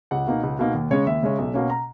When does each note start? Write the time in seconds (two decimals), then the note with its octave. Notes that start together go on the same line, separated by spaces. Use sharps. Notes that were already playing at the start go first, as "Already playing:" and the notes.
0.11 C#2 F#5
0.27 B2 A#3 D#4
0.43 C#2
0.59 B2 A#3 D#4
0.74 D#2
0.91 C#3 G#3 C#4 C#5
1.06 D#2 E5
1.22 C#3 G#3 C#4
1.38 B1
1.54 B2 A#3 C#4
1.70 A#5